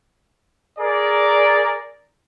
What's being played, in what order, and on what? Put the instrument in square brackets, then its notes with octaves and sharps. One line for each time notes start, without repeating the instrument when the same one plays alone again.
[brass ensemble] G#4 A#4 D5